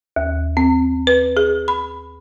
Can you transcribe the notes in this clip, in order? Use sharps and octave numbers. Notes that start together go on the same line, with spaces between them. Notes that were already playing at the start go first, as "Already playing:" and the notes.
D#2
C4
B4
G#4
B5